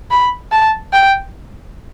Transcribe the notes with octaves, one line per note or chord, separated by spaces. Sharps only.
B5
A5
G5